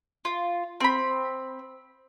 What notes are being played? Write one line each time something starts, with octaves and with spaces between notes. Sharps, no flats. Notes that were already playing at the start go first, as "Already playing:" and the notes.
F4
C4 B5